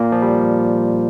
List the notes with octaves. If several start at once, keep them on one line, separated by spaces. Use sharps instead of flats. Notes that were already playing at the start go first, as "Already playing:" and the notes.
Already playing: A#2 A#3
F3
G3